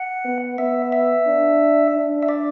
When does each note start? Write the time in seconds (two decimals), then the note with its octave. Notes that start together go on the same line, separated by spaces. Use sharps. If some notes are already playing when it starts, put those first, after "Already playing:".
Already playing: F#5
0.25 B3
0.58 B3 E5
0.92 E5
1.26 D4
1.95 D4
2.23 E5
2.29 D5